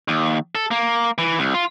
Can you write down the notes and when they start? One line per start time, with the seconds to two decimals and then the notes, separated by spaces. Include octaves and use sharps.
0.08 D#2
0.55 A4
0.71 A#3
1.18 E3
1.39 C2
1.54 F4